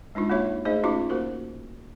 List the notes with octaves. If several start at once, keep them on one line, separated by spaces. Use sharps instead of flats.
G#3 D4 D#4 F4
A#3 D#4 F#4 C#5 E5
A3 D#4 G#4 C5 D#5
A3 C#4 D#4 F4 F#4 D6
A#3 F#4 A#4 C5